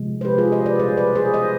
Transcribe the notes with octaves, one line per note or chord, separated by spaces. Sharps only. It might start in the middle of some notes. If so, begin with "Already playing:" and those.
Already playing: C3 F3 G#3
C5
G4 B4
F4 G#4
C5 D#5
B4 D5
B2 G3 G#4 C5
B4 D5
G#4 C5
C5 D#5